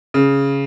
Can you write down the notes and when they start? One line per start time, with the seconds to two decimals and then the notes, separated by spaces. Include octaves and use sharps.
0.14 C#3